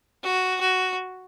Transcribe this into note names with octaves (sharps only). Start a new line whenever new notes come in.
F#4
F#4